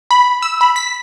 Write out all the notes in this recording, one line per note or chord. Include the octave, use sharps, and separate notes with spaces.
B5
E6
B5
B6